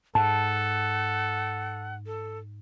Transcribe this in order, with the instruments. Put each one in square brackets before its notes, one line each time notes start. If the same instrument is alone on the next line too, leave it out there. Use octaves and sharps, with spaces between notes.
[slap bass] G#2 [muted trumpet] A4 [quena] F#5 [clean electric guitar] A5
[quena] A4